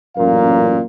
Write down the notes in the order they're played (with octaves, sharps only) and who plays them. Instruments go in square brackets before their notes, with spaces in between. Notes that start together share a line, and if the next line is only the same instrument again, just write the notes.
[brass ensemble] A1 F#2 A#2 A#3 A#4 F5